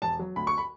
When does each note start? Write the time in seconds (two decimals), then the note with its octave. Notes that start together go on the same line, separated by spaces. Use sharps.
0.02 E1 A5
0.19 F#3
0.36 D2 B5
0.47 C#6
0.58 B5